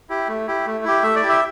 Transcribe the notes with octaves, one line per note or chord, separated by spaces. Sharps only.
E4 G4
A3
E4 G4
A3
E4 G4
A3 E5
D5
E4 G4
E5